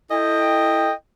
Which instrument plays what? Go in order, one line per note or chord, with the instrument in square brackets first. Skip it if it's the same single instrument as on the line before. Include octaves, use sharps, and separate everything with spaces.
[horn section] E4 A4 D#5 G5